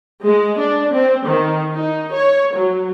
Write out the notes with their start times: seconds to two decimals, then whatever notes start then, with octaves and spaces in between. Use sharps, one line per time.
0.24 G#3
0.59 D4
0.94 C4
1.26 D#3
1.74 D#4
2.13 C#5
2.55 F#3